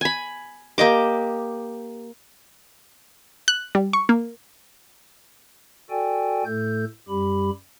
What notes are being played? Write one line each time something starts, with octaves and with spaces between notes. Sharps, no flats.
G#5 B5
A#3 G4 D#5 D6
F#6
G3
C#6
A#3
F#4 A4 D5 G5 G#5
A2 A3 A4 G6
F#2 G3 G4 B5